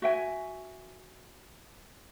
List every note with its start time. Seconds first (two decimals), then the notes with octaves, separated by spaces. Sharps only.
0.02 F#4 E5 G5 G#5